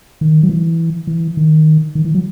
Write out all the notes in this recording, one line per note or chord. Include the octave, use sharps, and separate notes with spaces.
D#3
F#3
E3
E3
D#3
D#3
E3
F#3